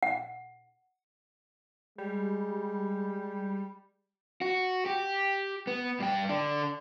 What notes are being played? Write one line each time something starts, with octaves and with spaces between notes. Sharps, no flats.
F#5
G3 G#3
F#4
G4
B3
G2 G5
D3 D4